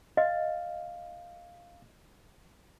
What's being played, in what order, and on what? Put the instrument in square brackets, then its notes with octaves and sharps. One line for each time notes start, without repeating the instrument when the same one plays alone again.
[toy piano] D#5 [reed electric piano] F5